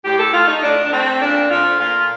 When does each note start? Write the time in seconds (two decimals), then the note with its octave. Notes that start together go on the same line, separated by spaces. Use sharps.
0.04 A2 G4
0.19 A4
0.33 A3 F4
0.48 D#4
0.63 A2 D4
0.84 D4
0.92 A3 C4
1.21 A#2 D4
1.50 F3 A3 F4
1.80 A#2 F4